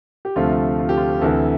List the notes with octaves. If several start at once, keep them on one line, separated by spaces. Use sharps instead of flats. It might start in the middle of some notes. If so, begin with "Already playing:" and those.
G4
D2 C3 F3 A3 F4
F4
G4
F4
D2 C3 E3 A4